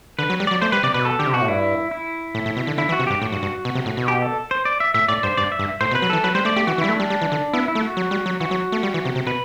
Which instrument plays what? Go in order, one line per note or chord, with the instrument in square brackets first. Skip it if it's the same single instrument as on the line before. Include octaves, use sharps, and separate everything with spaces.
[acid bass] D3 [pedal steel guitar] B4
[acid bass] F#3
G3
[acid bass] F#3 [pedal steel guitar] D5
[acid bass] A3 [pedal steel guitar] C5
[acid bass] G3 [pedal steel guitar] B4
[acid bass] C3 [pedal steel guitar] D5
[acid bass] B2 [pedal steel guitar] B4
[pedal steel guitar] A4
[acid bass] D3 [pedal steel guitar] G4
[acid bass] C3
[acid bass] B2 [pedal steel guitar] F#4
[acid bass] A2
[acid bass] G2 [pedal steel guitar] E4
[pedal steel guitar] E4
[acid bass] A2
A2
B2
D3
[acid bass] D3 [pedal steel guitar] E4
[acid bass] E3
[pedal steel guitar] F#4
[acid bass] C3
[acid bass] G2 [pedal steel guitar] G4
[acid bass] A2 [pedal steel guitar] F#4
[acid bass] G2
G2
B2
C3
A2
B2
[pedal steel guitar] G4
A4
C5
D5
E5
[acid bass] A2 [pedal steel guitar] E5
[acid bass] A2 [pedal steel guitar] D5
[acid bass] G2 [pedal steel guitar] C5
[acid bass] G2 [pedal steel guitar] D5
[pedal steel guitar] E5
[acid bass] G2
[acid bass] A2 [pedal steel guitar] C5
[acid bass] B2
[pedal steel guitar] B4
[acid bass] F#3
[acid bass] E3 [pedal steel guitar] A4
[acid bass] F#3 [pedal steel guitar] B4
[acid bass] G3 [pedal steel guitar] C5
[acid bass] A3 [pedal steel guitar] D5
[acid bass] A3 [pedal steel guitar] G4
[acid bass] E3 [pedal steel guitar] F#4
[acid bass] E3
[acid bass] G3 [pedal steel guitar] E4
[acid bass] A3
[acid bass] G3 [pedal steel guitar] D4
[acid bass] G3
E3
D3
[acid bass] B3 [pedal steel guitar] E4
[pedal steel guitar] E4
[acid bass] A3
[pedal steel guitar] F#4
[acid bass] F#3
G3
F#3
[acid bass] E3 [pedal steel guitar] F#4
[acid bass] F#3
A3
G3
E3
C3
C3
[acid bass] B2 [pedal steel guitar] B4